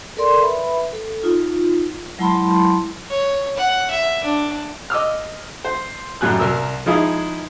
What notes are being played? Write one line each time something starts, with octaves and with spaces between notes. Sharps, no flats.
A4 A#4 D5 C6
B4 E5 B5
A4
D#4 F4
F#3 G#3 E4 A5 B5 C6
C#5
F#5
E5
D4
D#5 D6 E6 F6
C5
F#2 A2 G3 G#5 F#6
C2 A#4 E6
F3 G#3 D#4 E4 G#4